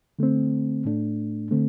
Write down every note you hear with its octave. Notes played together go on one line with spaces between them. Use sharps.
D3 A3 C4
A2 A3 D4
D3 A3 C4